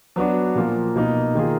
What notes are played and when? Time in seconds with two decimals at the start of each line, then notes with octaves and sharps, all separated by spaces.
0.16 F#3 B3 D4 F#4
0.55 A#2 F3 A#3
0.96 B2 A#3 D#4
1.35 D#3 A#3 F4 G#4